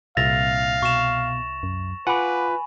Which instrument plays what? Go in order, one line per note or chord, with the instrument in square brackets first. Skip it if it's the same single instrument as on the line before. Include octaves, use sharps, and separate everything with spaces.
[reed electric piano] C2 E5 [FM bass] A#2 [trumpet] F5 [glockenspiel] A6 A#6 F7
[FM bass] B2 [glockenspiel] C#6 E7
[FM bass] F#2
[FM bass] F4 [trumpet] B4 [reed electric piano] F#5 D6 [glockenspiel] G#5 B5